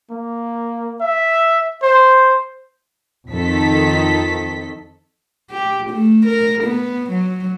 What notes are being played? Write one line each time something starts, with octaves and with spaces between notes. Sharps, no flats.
A#3
E5
C5
F2 D#3 A4 B6
G4
A3
A#4
B3
F#3